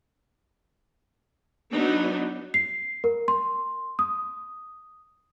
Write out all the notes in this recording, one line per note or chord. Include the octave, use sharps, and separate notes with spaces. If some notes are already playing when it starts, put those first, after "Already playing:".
F#3 B3 D4 D#4
C7
A#4
C6
D#6